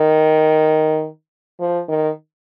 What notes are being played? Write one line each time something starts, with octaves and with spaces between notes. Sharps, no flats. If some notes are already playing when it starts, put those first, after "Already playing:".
Already playing: D#3
F3
D#3